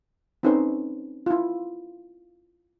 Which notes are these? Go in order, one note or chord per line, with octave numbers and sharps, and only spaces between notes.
C4 C#4 D#4 A4 B4 C5
E4 F4